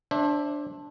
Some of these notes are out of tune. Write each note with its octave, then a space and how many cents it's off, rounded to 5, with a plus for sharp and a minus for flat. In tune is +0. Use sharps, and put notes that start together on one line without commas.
D4 +0 C5 +35 E5 +0